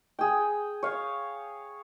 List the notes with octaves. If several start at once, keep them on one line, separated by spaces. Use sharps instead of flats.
G#4 G5
C#5 F5